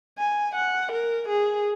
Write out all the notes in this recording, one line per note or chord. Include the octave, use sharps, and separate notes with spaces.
G#5
F#5
A#4
G#4